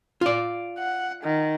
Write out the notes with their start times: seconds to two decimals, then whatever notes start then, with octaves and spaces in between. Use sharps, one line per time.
0.21 F4 D5
0.78 F#5
1.23 D#3